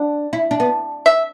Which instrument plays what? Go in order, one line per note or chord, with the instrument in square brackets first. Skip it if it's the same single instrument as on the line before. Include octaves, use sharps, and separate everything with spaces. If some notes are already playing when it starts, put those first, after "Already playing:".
Already playing: [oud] D4 [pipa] F#5
[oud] E4
D4
B3
[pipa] E5